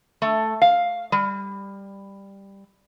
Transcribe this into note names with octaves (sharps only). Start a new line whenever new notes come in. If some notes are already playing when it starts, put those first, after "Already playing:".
A3
F5
G3